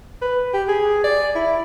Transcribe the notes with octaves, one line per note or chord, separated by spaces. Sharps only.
B4
G4
G#4
D5
E4